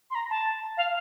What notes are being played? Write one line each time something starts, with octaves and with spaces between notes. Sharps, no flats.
C6
A#5
A5
F5